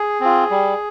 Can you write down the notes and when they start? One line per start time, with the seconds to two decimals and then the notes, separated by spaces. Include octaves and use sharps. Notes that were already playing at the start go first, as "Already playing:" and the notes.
Already playing: G#4
0.20 C4 F4
0.50 G3